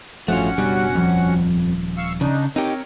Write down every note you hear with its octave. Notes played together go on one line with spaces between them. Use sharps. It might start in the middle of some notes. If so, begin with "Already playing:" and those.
A1 G2 F3 A3 C#4 F4 F#4 F#5
F#1 B2 G3 D4
D#1 F2 F3 G3
F5 C#6 E6
C#3 D4 D#4
C4 D#4 G4 A#4 C#5